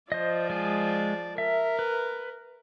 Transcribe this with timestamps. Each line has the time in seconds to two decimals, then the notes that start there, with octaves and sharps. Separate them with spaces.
0.12 F3 C5 D5 D#5
0.50 G#3 G#5
1.38 A#4 E5
1.79 B4